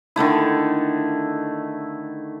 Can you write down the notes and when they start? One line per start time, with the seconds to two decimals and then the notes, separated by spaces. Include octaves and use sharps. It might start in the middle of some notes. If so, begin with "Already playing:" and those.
0.16 D3 D#3 A3 E4